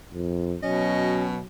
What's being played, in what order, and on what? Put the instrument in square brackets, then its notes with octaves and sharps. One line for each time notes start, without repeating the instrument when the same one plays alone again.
[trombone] F2
[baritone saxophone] B2 [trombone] F#3 [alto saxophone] C#4 [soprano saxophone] D#5